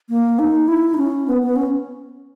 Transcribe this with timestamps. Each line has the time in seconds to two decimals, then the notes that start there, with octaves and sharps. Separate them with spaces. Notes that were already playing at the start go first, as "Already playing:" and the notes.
0.10 A#3
0.39 D#4
0.68 E4
0.94 D#4
0.98 C#4
1.28 B3
1.42 B3
1.56 C#4